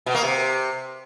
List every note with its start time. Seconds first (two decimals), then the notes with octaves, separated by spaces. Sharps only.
0.06 B2
0.15 A#3
0.23 C3